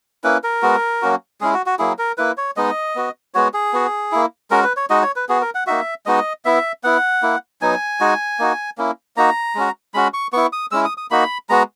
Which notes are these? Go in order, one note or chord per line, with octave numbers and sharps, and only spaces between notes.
A#3 C#4 E4 B4
A#4
G#3 B3 F#4
F#3 A#3 C#4 F#4
G#3 C#4 E4 G#4
F#4
F#4
F#3 A#3 E4 G#4
A#4
A#3 E4 B4
C#5
G#3 B3 D#4 D#5
B3 F#4
G#3 B3 F#4 C#5
G#4
B3 F#4
A#3 E4
G#3 C#4 F#4 A#4
B4
C#5
G#3 D#4 F#4 D#5
C#5
B4
B3 F#4 G#4
A#4
F#5
A#3 D#4 F#4 E5
G#3 B3 D#4 F#4 D#5
B3 E4 E5
B3 E4 F#5
A#3 E4
F#3 B3 D#4 G#5
G#3 D#4 F#4
A#3 D#4 F#4
A#3 C#4 E4
A#3 D#4 F#4 A#5
G#3 C#4 F#4
G#3 C#4 F#4 B5
C#6
B3 E4 C#6
D#6
G#3 C#4 E4 E6
D#6
D#6
A#3 D#4 F#4 B5
G#3 B3 F#4 A#5